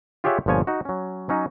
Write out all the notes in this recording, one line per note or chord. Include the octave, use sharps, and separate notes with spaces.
F4 G4 G#4 C#5 E5 F#5
G1 A#2 F3 C#5 G#5
D#4 F#4
F#3 C#4
F#3 C#4 D#4